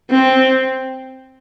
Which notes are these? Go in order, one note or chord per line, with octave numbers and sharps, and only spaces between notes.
C4